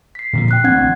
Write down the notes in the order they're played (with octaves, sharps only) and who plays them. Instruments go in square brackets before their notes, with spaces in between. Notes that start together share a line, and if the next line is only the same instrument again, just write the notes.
[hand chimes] B6 C7
[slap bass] A#2 D3 F3
[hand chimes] G5 F#6 C7
[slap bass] A1 C4 [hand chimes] D4 F#5 G#6